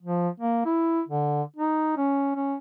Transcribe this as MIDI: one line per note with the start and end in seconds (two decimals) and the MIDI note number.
0.02 0.28 53
0.40 0.64 58
0.65 1.01 64
1.08 1.42 50
1.56 1.93 63
1.97 2.35 61
2.35 2.56 61